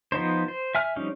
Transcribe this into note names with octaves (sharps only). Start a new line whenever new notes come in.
F3 B3 D#4 C5
C5
E5 G#5 F6
F3 G3 C#4 D#4